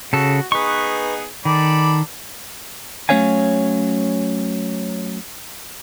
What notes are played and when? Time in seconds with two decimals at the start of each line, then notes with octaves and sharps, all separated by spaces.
0.13 C#3 F#4 A4
0.52 B3 D#4 G#4 B4 C#6
1.45 D#3 A4 D5 B5
3.09 F#3 A3 C#4 C#5 F5 G#5